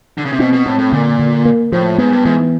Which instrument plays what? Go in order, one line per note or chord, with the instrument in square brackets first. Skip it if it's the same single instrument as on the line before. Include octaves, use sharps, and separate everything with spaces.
[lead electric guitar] D3
C#3
C3
[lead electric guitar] B2 [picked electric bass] C4
[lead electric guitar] B2
[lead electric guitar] A2 [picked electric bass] C4
[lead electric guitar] A2
[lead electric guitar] A#2 [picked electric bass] D3
[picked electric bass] D3
A#3
[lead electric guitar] A2 [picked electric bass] F3
[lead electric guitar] G#2 [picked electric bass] B3
[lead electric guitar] G2
[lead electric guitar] G#2 [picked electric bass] E3